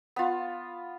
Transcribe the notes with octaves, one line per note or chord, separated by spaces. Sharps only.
B3 F4